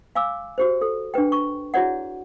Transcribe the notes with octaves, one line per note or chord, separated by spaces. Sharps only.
F5 G#5 D6 E6
F#4 G4 C5
A4
D4 G4 B4 G5
C#6
E4 F#4 G#4 C#5 D5 F#5